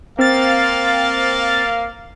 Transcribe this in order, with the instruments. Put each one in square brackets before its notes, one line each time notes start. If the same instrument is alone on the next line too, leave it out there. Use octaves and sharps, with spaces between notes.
[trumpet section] A#3 F5 [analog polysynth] C4 A6